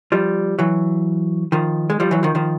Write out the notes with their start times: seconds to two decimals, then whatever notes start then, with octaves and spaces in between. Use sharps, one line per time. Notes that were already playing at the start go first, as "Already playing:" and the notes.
0.12 F3 G3
0.59 E3 F#3
1.52 D#3 F3
1.90 G#3
2.00 F3 G3
2.11 E3 F#3
2.23 D#3 F3
2.35 D#3 F3